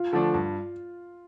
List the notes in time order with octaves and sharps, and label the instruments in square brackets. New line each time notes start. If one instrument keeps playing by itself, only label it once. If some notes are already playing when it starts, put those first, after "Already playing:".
Already playing: [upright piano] F4
[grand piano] D3 F3 A3 D4
G2